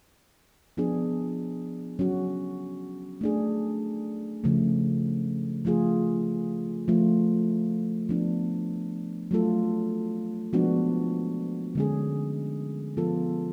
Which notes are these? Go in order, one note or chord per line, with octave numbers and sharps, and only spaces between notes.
F3 B3 D4 G#4
F#3 C#4 F#4
A3 D4 G#4
C#3 F3 A3
F3 A3 F4 G#4
F3 A3 F4
F3 B3 D4
F#3 A3 F4 A4
F3 G#3 B3 D4 F#4
D3 G#3 C#4 G#4
F3 B3 F4 A4